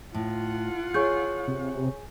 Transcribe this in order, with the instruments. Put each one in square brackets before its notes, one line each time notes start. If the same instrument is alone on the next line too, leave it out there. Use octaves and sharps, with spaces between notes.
[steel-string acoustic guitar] A2 [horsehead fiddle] F4 F#5
[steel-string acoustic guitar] G#4 [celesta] C#5 C#6 G6
[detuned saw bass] C3